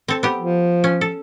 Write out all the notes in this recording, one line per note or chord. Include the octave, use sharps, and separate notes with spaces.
C4 A4
B3 G4
F3
C#4
A4